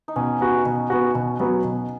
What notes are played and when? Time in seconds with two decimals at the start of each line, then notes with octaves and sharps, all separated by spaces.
0.08 D#4
0.16 B2 C#4
0.41 B3 F#4
0.66 B2
0.90 B3 F#4
1.15 B2
1.40 F#3 B3 F#4
1.64 B2